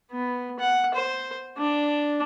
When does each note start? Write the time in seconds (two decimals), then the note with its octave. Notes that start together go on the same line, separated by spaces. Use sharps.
0.12 B3
0.60 F#5
0.95 C5
1.58 D4